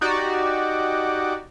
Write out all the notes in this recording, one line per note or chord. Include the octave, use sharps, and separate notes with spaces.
D#4 F#4 G4 D5